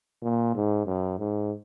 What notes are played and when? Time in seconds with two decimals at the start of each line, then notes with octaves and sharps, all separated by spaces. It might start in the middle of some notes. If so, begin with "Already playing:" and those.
0.22 A#2
0.55 G#2
0.86 F#2
1.18 G#2